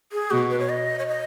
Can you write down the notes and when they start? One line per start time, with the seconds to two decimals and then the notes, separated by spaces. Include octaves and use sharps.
0.12 G#4
0.31 B2 F#4
0.50 B4
0.60 C#5
0.69 D#5
0.99 C#5
1.08 D#5